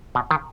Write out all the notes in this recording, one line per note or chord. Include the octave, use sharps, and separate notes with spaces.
B2
D#3